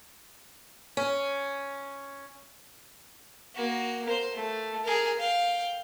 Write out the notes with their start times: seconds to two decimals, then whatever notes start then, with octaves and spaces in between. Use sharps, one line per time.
0.97 C#4
3.55 A#3 F#4
4.06 A#4 C5
4.35 A3
4.84 G#4 A#4
5.19 F5 G5